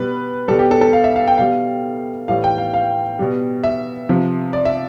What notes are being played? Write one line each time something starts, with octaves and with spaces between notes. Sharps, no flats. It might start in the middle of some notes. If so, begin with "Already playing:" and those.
Already playing: B2 G3 B4
B2 G3 A4
G4
A4
A4
F5
E5
F5
G5
B2 G3 F5
A2 E3 G3 F5
G5
F5
F5
B2 G3
E5
C3 F3
D5
E5